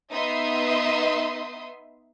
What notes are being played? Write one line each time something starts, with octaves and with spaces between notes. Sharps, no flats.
B3 D#4 E5 C6 D#6